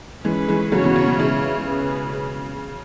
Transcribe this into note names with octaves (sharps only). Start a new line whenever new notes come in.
E3 G#3 C#4 G#4 B4
E3 G#3
C#3 F#3 C#4 F#4 C#5
B2 E3
C#3
B2
C#3 E3 G#3 E4 C#5
C#4 G#4 B4